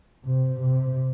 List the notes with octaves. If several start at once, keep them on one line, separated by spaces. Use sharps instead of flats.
C3
C3